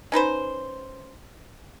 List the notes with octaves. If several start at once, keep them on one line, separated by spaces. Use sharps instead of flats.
C#4 D#4 B4 C5